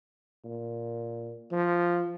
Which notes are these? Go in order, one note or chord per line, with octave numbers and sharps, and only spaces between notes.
A#2
F3